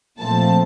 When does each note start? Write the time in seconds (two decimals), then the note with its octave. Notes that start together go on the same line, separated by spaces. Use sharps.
0.18 A#2 F3 A3 C4 A5